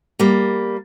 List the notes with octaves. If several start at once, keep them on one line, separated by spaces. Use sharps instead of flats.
G3 A#3